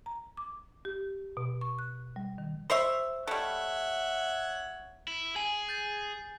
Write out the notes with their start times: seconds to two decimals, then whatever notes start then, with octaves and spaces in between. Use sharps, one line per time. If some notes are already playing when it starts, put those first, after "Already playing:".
0.06 A#5
0.37 D6
0.85 G4
1.37 B2
1.61 C#6
1.79 F#6
2.16 G3
2.38 D#3
2.70 C5 C#5 E5
3.27 G3 A3 C#5 E5 F#5
5.08 E4
5.36 G#4 G#5
5.69 G6 A6